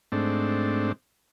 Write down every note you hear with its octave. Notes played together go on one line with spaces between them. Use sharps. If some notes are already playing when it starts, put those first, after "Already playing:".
G#2 A3 C4 D4